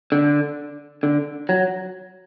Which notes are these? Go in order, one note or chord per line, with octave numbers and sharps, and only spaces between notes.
D3
D3
F#3